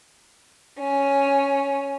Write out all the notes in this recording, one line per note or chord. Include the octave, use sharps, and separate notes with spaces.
C#4